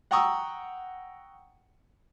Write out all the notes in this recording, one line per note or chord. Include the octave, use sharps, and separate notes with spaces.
F#5 G5 A#5 C#6 D#6 E6